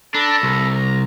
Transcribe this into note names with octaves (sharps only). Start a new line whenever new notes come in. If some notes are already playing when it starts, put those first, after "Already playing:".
D4 A4 A#5 B5
C2
A#5